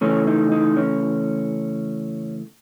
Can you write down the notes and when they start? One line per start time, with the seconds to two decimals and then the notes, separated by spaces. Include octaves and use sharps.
0.01 C#3 E3 A3 C#4
0.27 D#4
0.52 D#4
0.77 C#4